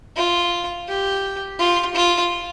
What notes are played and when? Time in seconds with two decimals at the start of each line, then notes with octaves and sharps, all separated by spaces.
0.16 F4
0.88 G4
1.59 F4
1.95 F4